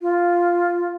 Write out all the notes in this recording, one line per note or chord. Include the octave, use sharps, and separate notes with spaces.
F4